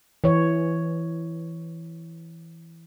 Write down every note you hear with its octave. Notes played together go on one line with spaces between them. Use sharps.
E3 C#5